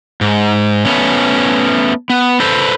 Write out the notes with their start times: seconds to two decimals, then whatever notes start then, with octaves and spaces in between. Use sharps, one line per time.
0.21 G#2
0.85 A3 B3 C#4
2.10 B3
2.40 A4 B4 C5